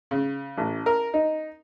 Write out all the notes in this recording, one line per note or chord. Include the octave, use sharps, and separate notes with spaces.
C#3
A1
A#4
D#4